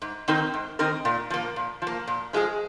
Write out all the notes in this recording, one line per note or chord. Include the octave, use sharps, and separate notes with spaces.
G#2
D#3 C4 D#4 A#4
G#2
D#3 C4 D#4 A#4
A#2
F3 A#3
A#2
F3
A#3
A#2
F3 G#3 F4 G#4